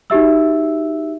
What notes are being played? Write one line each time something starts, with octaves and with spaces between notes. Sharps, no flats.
D#4 F#4 G4 E5 E6